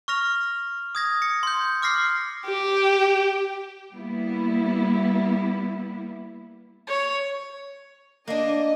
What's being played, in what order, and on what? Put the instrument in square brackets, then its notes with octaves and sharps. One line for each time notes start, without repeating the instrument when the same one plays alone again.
[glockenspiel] C#6 F6 A#6 F7
D#6 G#6 A#6
A#6 C#7
C6 G6
D6 F6 A#6 C7
[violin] G4
[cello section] G3 A#3 B3 E4
[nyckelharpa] C#5
[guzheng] A#3 D4 [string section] D#5